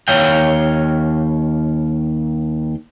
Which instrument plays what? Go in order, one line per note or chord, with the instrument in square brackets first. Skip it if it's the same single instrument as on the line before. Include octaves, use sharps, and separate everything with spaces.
[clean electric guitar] D#2 C#5 F5 G5